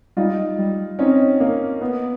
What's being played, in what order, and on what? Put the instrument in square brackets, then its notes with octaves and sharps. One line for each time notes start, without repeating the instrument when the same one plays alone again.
[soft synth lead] G3 [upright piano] D#4 F4
[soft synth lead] G3
[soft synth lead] C4 [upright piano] C#4 D#4
[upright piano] A#3
B3